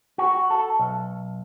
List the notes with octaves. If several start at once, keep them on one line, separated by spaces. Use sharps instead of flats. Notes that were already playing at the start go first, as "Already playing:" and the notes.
F#4
A4
B1